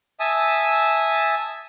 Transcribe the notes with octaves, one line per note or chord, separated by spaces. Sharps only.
E5 G#5 A5 D#6 E6